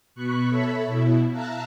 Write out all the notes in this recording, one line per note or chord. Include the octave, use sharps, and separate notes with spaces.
B2 B5 C#6 F#6
A4 C#5 E5 B5
B2 E4
E5 F5 A5 A#5 F#6